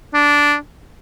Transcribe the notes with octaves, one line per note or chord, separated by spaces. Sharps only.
D4